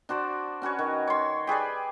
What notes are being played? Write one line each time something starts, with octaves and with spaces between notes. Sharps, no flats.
D4 F#4 C5 D5
C#4 F#4 B4 C#5
D#3
C#5 C6
G4 G#4 B4 D5